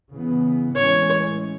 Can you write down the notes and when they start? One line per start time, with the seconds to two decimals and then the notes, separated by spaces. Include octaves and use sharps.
0.15 C#3 E3 B3
0.75 A2 E3 G#3 C#4 C#5